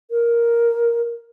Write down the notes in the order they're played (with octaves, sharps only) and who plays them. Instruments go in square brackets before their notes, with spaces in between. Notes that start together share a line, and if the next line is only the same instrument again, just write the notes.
[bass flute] A#4